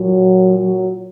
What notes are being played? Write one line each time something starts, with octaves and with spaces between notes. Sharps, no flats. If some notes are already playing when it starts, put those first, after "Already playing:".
Already playing: A#2 F#3
F#3